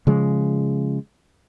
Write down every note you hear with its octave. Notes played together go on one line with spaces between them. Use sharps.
C#3 F3 G#3